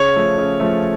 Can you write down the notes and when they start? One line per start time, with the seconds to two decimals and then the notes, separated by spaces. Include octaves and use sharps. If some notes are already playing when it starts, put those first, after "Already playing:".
Already playing: C#3 C#5
0.16 F3 A3
0.38 C#3
0.60 F3 A3